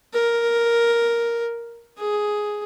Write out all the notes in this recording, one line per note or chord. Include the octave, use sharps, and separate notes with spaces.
A#4
G#4